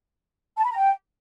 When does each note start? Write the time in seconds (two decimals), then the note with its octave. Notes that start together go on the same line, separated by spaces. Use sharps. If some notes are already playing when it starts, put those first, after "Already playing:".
0.58 A5
0.64 B5
0.70 A#5
0.77 G5